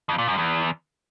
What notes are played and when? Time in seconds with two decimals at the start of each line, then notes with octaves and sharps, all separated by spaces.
0.09 F2
0.18 A#2
0.28 F#2
0.38 E2